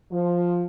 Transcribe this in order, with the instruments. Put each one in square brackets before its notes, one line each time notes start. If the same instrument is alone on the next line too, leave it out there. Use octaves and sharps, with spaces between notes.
[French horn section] F3